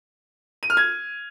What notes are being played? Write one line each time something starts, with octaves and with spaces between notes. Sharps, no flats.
D#7
F6
G#6